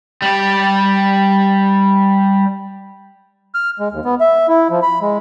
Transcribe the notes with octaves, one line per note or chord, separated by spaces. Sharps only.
G3 G4
F6
G#3
D#2
B3
E5
E4
F3
B5
G#3